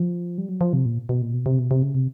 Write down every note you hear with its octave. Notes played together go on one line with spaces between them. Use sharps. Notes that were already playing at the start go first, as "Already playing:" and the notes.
Already playing: F3
G3
F#3
F3
C3
A#2
B2
A#2
B2
C3
B2
C3
C#3
C3